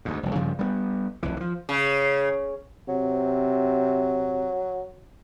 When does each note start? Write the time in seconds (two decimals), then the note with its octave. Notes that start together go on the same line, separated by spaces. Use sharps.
0.05 D2 G#2
0.23 F1 C2
0.35 G2 C#3 F3 G3
0.59 G3 A3 B3
1.23 F1 C2 E3
1.37 E3 F3
1.69 C#3
2.88 C3 F#3